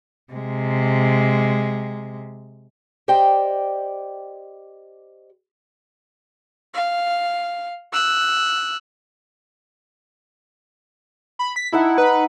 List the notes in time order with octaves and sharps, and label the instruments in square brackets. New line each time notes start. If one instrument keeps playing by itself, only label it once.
[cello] C3 G#3
[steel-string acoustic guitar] G4 C5 D5 D#5 G5
[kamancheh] F5
E6 F#6
[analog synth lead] B5
B6
[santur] D#4 A4 F#5 [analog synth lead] E4
[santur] D#4 [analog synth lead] B4